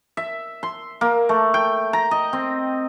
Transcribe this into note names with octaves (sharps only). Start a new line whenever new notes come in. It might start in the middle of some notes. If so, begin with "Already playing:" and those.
E5
C6
A#3
A3
G5
A#5
D#5
C4